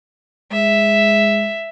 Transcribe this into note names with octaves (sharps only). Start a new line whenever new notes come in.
G#3 E5